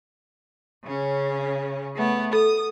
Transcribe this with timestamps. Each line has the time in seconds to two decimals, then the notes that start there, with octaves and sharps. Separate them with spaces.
0.84 C#3 C#4
1.96 A3 B3
2.33 A4 D#6